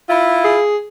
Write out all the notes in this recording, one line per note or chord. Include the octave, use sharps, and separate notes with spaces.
E4 F4
G#4